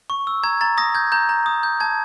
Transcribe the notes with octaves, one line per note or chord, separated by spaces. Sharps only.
C#6
E6
A#5 G#6
A#5 A6
D#6 A#6
G6 G#6
A#5 G6
A#5
D#6
G6
A5 G#6